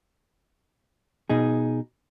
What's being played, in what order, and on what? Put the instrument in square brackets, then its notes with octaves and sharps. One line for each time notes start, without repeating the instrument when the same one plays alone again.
[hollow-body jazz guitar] B2 D#4 G#4